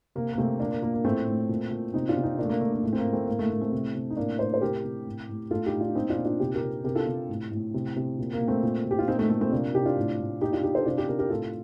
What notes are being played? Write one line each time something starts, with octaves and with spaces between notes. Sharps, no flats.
C3 A#3
A#3
C3 A3 C4
A#2 A#3 D4
A#3
A#2 A#3
A#3
A2 A3 C4
A2
A#2
A#2
C3 C4 D#4
D4 F4
C3
C4 D#4
A#2 A#3 D4
A3
A#3
A#2 A3
A#3
A2 A3
C4
A#3
A2
A3 C4
A2 A#3
A3
A2 A#3
A3 C4
C3
C3
D#4
A2 A#3 D4
A2 C5
A4 C5
C3 G4 A#4
C3
A2
A2
A2 F4 A4
D#4 G4
A2
D4 F4
A#2 C4 D#4
D4 F4
A#2
D4 F4
C3 D#4 G4
G4 A#4
C3
C3 G4 A#4
F4 A4
C3
A2
A2
C3
C3
A#2
A#3
A#2
A3 C4
A#2
A#2
G4
F4
A#2 C4 D#4
A3 C4
A#2 A3
A3 C4
C3 A#3 D4
C3 D#4 G4
D4 F4
A2
A2
A#2 D#4 G4
D4 F4
A#2 D#4 G4
A4 C5
C3 D4 F4
D#4 G4
C3 G4 A#4
G4 A#4
A2 F4 A4